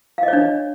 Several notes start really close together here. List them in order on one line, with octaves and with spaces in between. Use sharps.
F5 D#5 C#5 D4